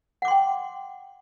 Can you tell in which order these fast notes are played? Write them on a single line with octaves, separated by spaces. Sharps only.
F#5 D6 C6 G5